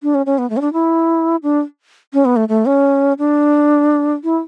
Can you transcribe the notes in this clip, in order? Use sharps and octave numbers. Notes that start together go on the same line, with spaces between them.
D4
C#4
C#4
B3
A3
C#4
D4
E4
D4
C#4
B3
A3
A3
C#4
D4
E4